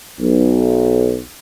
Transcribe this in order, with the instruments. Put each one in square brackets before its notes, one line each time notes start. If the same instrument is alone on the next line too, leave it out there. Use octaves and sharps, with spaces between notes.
[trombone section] B1